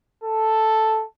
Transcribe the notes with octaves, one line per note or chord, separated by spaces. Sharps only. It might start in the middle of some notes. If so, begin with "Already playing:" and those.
A4